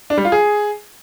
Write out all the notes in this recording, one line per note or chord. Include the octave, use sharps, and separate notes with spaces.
D4
G3
F4
G#4